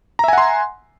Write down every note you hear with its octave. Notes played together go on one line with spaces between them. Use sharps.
E5 F#5 G#5 A#5 C6